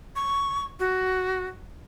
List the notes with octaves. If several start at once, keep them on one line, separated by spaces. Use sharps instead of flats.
C#6
F#4